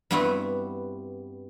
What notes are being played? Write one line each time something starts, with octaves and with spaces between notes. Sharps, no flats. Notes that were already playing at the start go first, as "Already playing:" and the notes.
G2 G3 B3 C4 E4 F#4